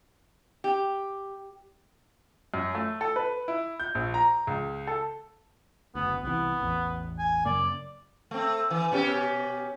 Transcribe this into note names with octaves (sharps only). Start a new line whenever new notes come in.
G4
F#2
A3
A4
B4
E4
G6
A#1
A#5
C#2
A4
F#1 D2 B3
C2 C3 E3 B3
A1 E2
G#5
F#2 C#3 A#3 D5
A3 C4
E3
B2 C#4 G4